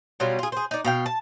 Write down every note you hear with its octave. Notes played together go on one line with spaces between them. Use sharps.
B2 F#3 G3 F4
F4 G#4
G#4 C5
D#4 D5
B2 F5 G5
A5